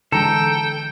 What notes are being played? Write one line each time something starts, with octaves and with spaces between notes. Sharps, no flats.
D3 E3 G#3 A4 G5 A#5